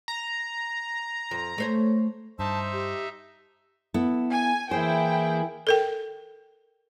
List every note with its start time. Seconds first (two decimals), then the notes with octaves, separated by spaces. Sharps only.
0.08 A#5
1.31 F2
1.58 A3 C5 C#5
2.39 G2 D#4 C5 E5 A5
2.73 G4
3.94 B3 E4 A4
4.32 G#5
4.71 E3 A#3 E4 G#4 C5 G5
5.67 A4 A#4 G5